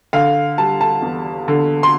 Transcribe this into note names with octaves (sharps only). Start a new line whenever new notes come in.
D3 F5
G3 A5
A5
E2
D3
C6